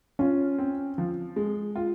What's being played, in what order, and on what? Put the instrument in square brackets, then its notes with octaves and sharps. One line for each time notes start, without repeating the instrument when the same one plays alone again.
[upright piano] C#4 [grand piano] F4
[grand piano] C4
F3
G#3
F4